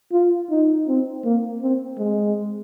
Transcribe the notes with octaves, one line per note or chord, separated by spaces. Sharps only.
F4
D#4
C4
A#3
C4
G#3